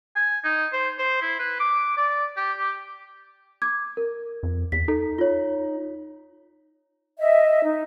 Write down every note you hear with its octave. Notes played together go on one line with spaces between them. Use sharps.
G#5
D#4
C5
C5
E4
B4
D6
D5
G4
G4
D6 G#6
A#4
F2
E2 B6
D#4 A4
F4 C#5
D#5 E5
D#4